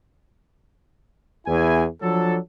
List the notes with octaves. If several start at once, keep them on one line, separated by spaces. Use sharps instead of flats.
E2 E4 G#5
F3 F#3 D4 A4